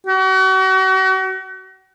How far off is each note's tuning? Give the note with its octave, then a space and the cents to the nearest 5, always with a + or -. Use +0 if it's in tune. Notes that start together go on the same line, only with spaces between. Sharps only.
F#4 +40